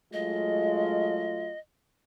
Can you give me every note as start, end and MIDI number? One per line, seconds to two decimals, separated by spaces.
0.13 1.53 54
0.13 1.32 56
0.13 1.53 57
0.13 1.53 65
0.13 1.59 75